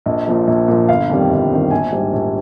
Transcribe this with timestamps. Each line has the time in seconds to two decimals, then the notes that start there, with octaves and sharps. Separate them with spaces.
0.06 A#1 D#5
0.27 A#2 F3
0.47 A#1
0.68 A#2 F3
0.89 G1 F5
1.10 F2 D#3 G3
1.30 G1
1.50 F2 D#3 G3
1.71 A#1 G#5
1.92 G#2 G3
2.13 A#1